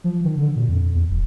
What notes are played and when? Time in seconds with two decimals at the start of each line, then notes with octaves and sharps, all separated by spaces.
0.04 F3
0.24 D#3
0.37 D3
0.56 A#2
0.68 F2
0.95 E2
1.10 D#1